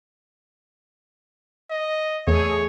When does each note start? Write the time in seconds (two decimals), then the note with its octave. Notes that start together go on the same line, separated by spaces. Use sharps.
1.70 D#5
2.27 E2 A3 G#4 C#5